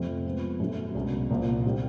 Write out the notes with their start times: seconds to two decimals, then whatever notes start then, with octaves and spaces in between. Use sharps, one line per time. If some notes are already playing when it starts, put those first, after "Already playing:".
Already playing: F2 C3 F3 A3 C4
0.26 F3 G#3 B3
0.60 F#2 D3 F#3 A3
0.95 C2 B2 G#3 C#4
1.30 C2 A#2 F3 A#3
1.65 D#3 G3 C4